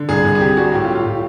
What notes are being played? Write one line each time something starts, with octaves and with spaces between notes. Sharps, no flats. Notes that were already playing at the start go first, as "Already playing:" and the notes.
Already playing: D3
C2 G#4
C2
G#4
C3 G4
G3 F#4
A2 G4
F4
F#3
F4
A2 F4